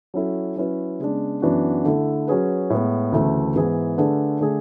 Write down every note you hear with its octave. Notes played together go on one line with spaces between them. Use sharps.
F#3 C#4 E4 A4
F#3 C#4 E4 B4
C#3 G#3 B3 D4
F#2 E3 B3 D4 F#4
D3 A3 E4 A4
F#3 C#4 G#4 B4
A2 G#3 B3
D2 C#3 E3 A3
G#2 E3 B3 E4 G#4
D3 A3 D4 G#4 B4
D3 A3 D4 G#4